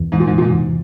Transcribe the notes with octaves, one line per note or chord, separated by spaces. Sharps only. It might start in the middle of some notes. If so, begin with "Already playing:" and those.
Already playing: E2
G#2 E3
A#2
G#2
C3
A#2
G#2
E2